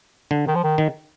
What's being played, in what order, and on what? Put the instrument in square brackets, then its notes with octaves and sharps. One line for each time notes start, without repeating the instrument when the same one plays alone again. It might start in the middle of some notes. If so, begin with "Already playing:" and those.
[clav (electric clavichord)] D3
[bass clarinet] D#3
F3
D#3
[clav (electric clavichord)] D#3